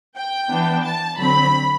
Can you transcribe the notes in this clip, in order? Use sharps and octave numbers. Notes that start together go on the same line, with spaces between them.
G5
E3 B3 D4
A5
D3 F#3 C4 B5